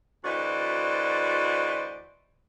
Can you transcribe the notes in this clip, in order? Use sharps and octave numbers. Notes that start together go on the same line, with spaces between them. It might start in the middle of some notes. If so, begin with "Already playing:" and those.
D2 E3 F#4 C5 D5 D#5